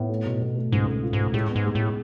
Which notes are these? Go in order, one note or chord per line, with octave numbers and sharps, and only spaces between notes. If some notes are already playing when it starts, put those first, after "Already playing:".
Already playing: A2 B3
A3
B2
B2
A3
C#2 G#2
A3
F4
G#2
A3
A2 G#3
B3
G#2
G#3
A2
G#3